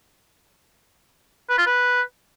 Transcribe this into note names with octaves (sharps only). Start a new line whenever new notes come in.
B4
F4
B4